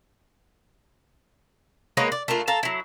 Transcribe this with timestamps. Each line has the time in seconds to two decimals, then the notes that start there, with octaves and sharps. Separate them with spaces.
1.97 G#3 A#3 B3 C#5
2.12 D5
2.28 A3 A#3 D4 F4
2.48 A4 F5 A5 A#5
2.63 F#3 E4